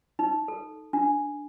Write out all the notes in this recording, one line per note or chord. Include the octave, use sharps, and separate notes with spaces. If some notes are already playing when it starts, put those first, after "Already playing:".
D#4
A4
D4